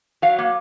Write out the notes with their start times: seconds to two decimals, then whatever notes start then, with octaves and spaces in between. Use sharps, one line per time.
0.22 F#3 F5
0.39 A#3